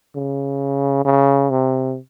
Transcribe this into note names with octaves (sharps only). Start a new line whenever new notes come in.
C#3
C#3
C3